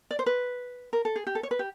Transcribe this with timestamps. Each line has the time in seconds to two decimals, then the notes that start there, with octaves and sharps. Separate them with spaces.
0.11 D5
0.19 C5
0.26 B4
0.93 A#4
1.05 A4
1.16 G#4
1.27 G4
1.35 A4
1.43 C#5
1.51 B4
1.59 G4